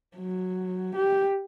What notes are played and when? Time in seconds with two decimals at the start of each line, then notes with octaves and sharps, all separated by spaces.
0.17 F#3
0.96 G4